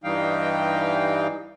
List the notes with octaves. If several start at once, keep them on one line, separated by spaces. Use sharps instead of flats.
G2 E3 G3 D#4 F5 G5